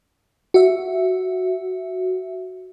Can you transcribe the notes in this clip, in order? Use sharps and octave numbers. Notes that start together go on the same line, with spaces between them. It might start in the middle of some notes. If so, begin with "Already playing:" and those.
F#4 E5